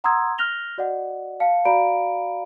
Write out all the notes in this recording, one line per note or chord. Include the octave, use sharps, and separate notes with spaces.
F#5 A#5 C6 D#6 E6 G#6
F6 F#6 A#6 F7 G7
F#4 D5 D#5 F#5
F5 A5 C#7
F#4 D5 F5 A#5 B5 D7